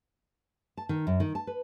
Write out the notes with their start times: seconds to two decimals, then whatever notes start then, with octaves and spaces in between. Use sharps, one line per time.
0.77 A5
0.89 D#3
1.07 F#2
1.20 D#3
1.35 A5
1.47 B4